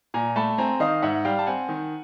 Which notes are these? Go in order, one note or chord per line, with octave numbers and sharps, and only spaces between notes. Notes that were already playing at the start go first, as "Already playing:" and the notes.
A#2 G#5 A#5
A3 A5 B5
C4 G#5 A#5
D#3 D#5 F5
G#2 E5 F#5
G3 F5 G5
A5
C4 F#5 G#5
D#3